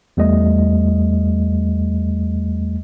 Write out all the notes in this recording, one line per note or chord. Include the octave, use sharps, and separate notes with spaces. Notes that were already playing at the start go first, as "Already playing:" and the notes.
E2 G3 A3 D#5